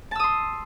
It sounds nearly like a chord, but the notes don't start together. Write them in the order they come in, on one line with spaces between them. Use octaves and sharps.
A5 E6 D#6 C6